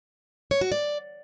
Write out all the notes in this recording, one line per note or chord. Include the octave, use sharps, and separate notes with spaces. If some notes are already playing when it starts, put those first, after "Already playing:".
C#5
F#4
D5